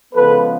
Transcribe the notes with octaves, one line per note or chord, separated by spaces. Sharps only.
C#3 F3 G#3 B3 A4 B4